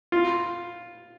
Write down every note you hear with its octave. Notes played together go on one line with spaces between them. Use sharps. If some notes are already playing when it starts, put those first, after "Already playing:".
F4